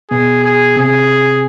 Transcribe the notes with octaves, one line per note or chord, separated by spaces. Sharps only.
B2 B3 G#4
G#4
C3 C4 G#4